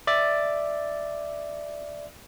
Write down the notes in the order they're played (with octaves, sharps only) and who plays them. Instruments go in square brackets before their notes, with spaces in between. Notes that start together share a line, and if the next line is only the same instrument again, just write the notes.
[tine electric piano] D5 E5 A6